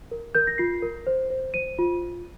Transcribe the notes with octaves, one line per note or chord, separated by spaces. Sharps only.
A#4
A#4 G6
A#6
F4 C7
A#4
C5
C5
C5 D#7
F4
F4